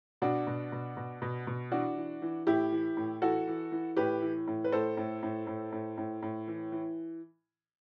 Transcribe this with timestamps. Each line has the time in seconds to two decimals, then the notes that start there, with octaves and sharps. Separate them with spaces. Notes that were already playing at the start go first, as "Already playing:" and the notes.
0.22 B2 D4 F#4
0.47 B2
0.72 B2
0.97 B2
1.22 B2
1.47 B2
1.72 E3 D4 F#4
1.97 E3
2.22 E3
2.47 A2 E4 G4
2.72 E3
2.97 A2
3.22 E3 F#4 A4
3.47 E3
3.72 E3
3.97 A2 G4 B4
4.22 E3
4.47 A2
4.64 B4
4.72 A2 A4 C5
4.97 A2
5.23 A2
5.47 A2
5.72 A2
5.98 A2
6.22 A2
6.48 E3
6.72 E3